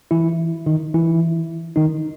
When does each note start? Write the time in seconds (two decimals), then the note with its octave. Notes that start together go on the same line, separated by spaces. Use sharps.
0.11 E3 E4
0.66 D#3 D#4
0.94 E3 E4
1.76 D#3 D#4